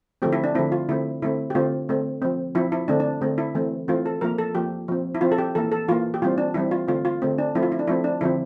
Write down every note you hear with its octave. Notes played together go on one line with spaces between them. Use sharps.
D3 F3 A3 C4 G4
E4
D4
D3 F3 A3 C4 E4
F4
D3 A3 C4 E4
D3 A3 C4 E4
G4
D3 A3 C4 F4
D3 A3 C4
F3 C4
F3 C4 E4
E4
D3 A3 C4 D4
D4
D3 A3 C4
E4
E3 A3 C4
E3 A3 C4 F4
A4
F3 A#3 A#4
A4
F3 A#3 G4
F3 C4
E4
F3 C4 F4
A4
G4
E3 A#3 A4
A4
E3 A#3 F4
G4
E3 G3 C4 F4
D4
E3 G3 C4 E4
F4
D3 A3 C4 F4
F4
D3 A3 C4
D4
F3 A3 C4 E4
F4
E4
D4
F3 A3 C4 E4
D4
D3 F3 C4 E4